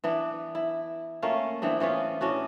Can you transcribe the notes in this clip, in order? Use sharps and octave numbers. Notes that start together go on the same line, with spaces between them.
E3 B3 D4
E4
A3 A#3 C#4 F4
E3 B3 C4 D4
E3 B3 C#4 F4
A2 C#4 D4 F#4